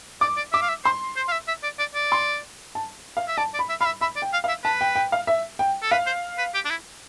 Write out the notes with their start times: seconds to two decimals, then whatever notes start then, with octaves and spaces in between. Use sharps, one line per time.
0.21 D5 D6
0.37 D5
0.53 E5 D6
0.63 F5
0.69 E5
0.85 C5 C6
1.17 C5
1.28 F5
1.32 E5
1.48 E5
1.63 D5
1.79 D5
1.95 D5
2.12 C6
2.75 A5
3.17 F5
3.28 E5
3.38 D5 A5
3.54 D5
3.59 B5
3.69 E5
3.81 F5 B5
3.86 E5
4.01 E5 B5
4.16 D5
4.22 G5
4.33 F5
4.44 F5
4.49 E5
4.64 B4 A5
4.81 G5
4.95 G5
5.12 F5
5.27 E5
5.59 G5
5.83 A4
5.91 B4 F5
6.06 C5
6.39 B4
6.55 G4
6.66 D4
6.70 E4